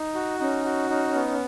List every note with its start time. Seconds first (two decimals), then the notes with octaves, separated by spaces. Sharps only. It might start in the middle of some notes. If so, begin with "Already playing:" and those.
Already playing: D#4
0.15 F#4
0.39 C#4 D#4
0.64 F#4
0.90 D#4
1.14 B3